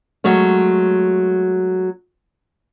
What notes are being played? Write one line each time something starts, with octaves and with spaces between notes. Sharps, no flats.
F#3 G#3 A3 C#4